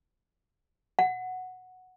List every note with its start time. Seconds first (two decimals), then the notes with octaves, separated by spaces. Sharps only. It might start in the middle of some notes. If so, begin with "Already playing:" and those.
0.99 F#5